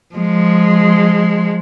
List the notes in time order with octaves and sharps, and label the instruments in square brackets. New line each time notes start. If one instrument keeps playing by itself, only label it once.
[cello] F3 G#3